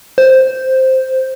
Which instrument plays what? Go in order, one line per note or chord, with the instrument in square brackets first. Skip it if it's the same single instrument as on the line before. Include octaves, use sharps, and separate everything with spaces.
[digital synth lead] C5